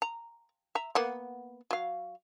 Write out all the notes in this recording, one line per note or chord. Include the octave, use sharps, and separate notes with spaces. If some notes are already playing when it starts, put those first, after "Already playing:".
A#5
E5 A#5
A#3 B3 F#5
F#3 F5